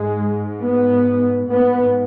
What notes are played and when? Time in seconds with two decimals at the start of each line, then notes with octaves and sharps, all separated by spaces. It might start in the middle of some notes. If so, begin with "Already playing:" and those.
Already playing: G#2 G#3
0.62 B3
1.50 G#2 B3